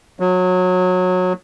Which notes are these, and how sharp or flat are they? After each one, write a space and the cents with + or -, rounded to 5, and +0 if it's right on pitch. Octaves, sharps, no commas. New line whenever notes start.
F#3 -20